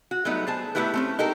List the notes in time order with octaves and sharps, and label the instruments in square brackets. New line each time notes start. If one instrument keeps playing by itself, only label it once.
[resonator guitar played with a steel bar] F#4
F#3 G3 A3 B3 D#4
G#4 C5 A5
A3 B3 C4 E4 G4 B4
A3 C4 C#4
D#4 G4 A4 A#4